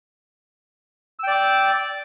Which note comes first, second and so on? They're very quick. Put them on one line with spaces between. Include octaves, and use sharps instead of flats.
E6 G5 D5 D6